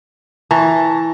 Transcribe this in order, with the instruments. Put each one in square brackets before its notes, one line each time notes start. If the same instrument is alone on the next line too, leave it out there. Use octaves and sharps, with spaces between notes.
[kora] E3 [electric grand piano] A5 A#5 C#6